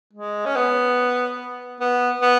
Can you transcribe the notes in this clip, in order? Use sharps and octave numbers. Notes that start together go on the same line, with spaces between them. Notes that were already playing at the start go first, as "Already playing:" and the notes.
G#3
C#4
B3
B3
B3